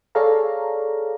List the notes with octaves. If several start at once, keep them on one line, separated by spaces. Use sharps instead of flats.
G#4 A4 C#5 D5 F5 A#5